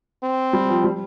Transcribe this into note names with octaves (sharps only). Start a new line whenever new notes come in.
C4
G3
F3
G3